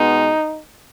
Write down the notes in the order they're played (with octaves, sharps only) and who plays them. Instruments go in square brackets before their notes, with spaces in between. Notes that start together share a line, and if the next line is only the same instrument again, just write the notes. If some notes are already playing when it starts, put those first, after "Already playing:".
Already playing: [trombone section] B2 G#3 B3 D#4